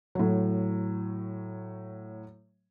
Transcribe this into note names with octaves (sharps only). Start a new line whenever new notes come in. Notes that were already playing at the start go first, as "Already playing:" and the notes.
A2 F#3